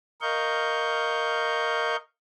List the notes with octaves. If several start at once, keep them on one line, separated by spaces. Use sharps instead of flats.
A#4 D#5 F5 C#6 G6